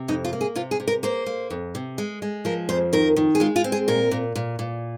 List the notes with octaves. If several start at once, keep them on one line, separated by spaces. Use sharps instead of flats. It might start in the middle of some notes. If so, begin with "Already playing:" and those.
Already playing: C3
F2 D#4
F4
A#3
G#4
C3 F4
G#4
C3
A#4
A#3 C5
A#3
F2
C3
G#3
G#3
F3 A#4
F2 C5
D#3 A#4
D#3
G#4
G#3 F4
F4
C4
G#4
A#2 A#4
A#2
A#2
A#2